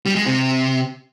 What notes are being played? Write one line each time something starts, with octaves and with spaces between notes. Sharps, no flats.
G3
G#3
C3